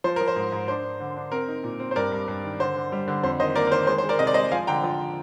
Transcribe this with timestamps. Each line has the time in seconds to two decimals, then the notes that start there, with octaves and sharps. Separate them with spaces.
0.04 F3 C5
0.16 F3 A#4
0.28 C5
0.36 G#2
0.52 G#2
0.68 D4 C5
0.84 D4
1.00 D3
1.17 D4
1.32 C4 A#4
1.48 D#4
1.64 A#2
1.80 C4
1.91 C5
1.96 G2 A#4 D5
2.12 G2
2.28 G2
2.44 D#3
2.60 D3 C5
2.76 D3
2.92 G3
3.08 D3
3.23 F2 C5
3.40 D#3 C5 D#5
3.55 A#3 A#4 D5
3.67 A#4
3.72 D#3 C5
3.87 G#3 C5
3.98 C5
4.04 G#3
4.09 A#4 D5
4.19 C3 D#5
4.27 D5
4.34 G#3 C5 D#5
4.52 F3 F5 G#5
4.67 D3 G5 A#5
4.84 F3